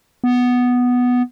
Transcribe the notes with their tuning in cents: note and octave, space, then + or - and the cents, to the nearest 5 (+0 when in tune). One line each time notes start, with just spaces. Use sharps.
B3 +0